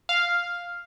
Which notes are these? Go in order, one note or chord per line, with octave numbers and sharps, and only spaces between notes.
F5